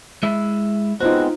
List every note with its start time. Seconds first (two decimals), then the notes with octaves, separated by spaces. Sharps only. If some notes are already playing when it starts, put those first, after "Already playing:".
0.23 G#3 E4 E5
1.00 G#3 B3 C4 D#4 F4 F#4 C5